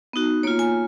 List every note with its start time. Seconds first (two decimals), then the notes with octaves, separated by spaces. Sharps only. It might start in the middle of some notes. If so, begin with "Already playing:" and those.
0.13 B3 D#4 F#4
0.43 A#3 F4 C#5
0.59 G#5